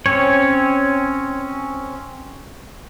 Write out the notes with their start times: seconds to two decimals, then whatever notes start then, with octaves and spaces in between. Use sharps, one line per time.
0.06 C4 C#4 C#5